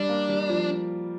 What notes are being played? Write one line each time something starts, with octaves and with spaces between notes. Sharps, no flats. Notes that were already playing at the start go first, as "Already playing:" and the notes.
Already playing: G3 D4
A#3
G3
F3